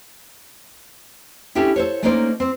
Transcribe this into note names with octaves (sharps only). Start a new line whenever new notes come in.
C#4 D4 E4 G4 A4
A4 C5 C#5
A3 A#3 C#4 D#4 C5 D5
C4